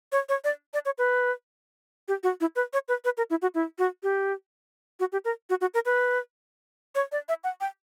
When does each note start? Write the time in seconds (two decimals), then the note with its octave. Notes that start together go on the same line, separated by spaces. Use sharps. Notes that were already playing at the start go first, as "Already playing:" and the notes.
0.12 C#5
0.29 C#5
0.44 D5
0.74 D5
0.85 C#5
0.98 B4
2.08 G4
2.23 F#4
2.41 E4
2.56 B4
2.73 C#5
2.88 B4
3.05 B4
3.17 A#4
3.30 E4
3.42 F#4
3.55 E4
3.79 F#4
4.03 G4
5.00 F#4
5.12 G4
5.25 A#4
5.50 F#4
5.61 F#4
5.74 A#4
5.85 B4
6.95 C#5
7.12 D5
7.29 E5
7.44 F#5
7.61 G5